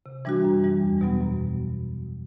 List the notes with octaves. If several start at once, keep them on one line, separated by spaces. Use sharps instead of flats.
C3
E3 G3 D4 F#4
F#2
E3 G3
E2
B2 F#3 B3
F#2